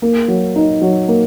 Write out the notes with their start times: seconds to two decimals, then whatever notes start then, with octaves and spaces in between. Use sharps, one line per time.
0.02 A#3
0.28 F#3
0.56 D#4
0.82 F#3
1.08 A#3